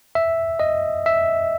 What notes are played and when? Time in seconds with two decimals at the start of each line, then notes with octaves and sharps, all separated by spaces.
0.15 E5
0.60 D#5
1.06 E5